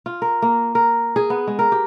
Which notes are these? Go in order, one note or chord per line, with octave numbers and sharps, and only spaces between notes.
F4
A#4
A#3
A#4
G#4
B3
G#3
A#4
G4